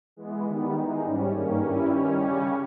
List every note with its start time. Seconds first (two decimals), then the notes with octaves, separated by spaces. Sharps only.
0.16 E3 G#3 B3
0.46 D#3 G3 B3
0.75 E3 G#3 D#4
1.03 G#2 G3 C#4
1.33 G2 D#3 A#3 C#4
1.61 G2 G3 C#4 E4
1.90 D#3 G3 C#4
2.18 C#3 G3 C#4